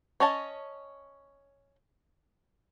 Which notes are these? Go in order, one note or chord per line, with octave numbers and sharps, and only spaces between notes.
C#4 C#5 D#5 A5